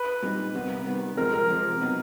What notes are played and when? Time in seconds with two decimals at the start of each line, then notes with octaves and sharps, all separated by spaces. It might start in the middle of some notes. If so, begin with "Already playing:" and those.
Already playing: B4
0.23 A#2 G3 C4 D#4
0.54 C3 D#3 G3 B3
0.86 C3 D#3 G3 B3
1.17 C3 F3 G#3 C4 A#4
1.34 A#4
1.49 C3 F3 G#3 C4
1.81 B2 F#3 B3 D#4